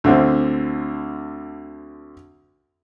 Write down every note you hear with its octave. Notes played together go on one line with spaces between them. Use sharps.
D2 D3 C4